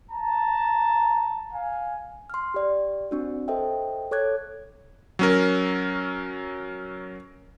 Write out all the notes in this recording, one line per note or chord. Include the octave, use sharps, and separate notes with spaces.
A5 A#5
F5 G#5
C6 F6
G4 D5
C4 D4 F#4
A4 C5 D#5 E5 G5
A4 C#5 D6 F#6 G#6
F#3 C#4 A#4